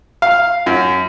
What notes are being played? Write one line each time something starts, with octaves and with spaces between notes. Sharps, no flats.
F5
F#2